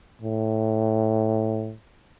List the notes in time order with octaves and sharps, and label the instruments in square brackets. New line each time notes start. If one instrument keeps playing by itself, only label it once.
[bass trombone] A2